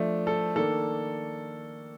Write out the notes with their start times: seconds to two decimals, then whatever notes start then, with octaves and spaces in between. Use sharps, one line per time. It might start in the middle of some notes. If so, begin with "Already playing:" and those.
Already playing: F3 A3 D4
0.27 A4
0.55 D#3 A#3 D4 A4